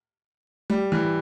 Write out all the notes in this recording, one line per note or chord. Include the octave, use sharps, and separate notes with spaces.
G3
E3